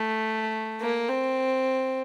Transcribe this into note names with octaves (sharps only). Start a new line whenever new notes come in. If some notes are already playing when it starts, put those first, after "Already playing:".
Already playing: A3
A#3
C4